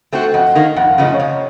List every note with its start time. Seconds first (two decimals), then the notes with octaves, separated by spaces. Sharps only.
0.13 A3 C4 F#4
0.34 F2 D#5 F#5
0.55 D#3 A#3
0.76 F2 F#5
0.89 F5
0.98 C#3 F3 A3 D#5
1.14 C#5 F5
1.20 C3